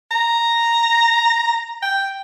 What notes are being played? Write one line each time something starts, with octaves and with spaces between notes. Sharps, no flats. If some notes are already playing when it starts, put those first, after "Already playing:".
A#5
G5